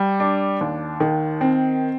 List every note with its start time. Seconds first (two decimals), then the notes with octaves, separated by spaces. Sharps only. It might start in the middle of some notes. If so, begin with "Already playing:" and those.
Already playing: G3
0.20 D4
0.61 D#2
1.00 D#3
1.41 C4